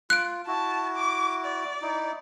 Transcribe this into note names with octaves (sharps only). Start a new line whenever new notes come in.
F4 F#6 D7
E4 F#4 A5
D6
D5
D#4 E4